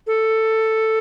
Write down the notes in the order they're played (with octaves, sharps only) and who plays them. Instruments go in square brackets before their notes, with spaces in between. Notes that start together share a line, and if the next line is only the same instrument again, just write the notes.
[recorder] A4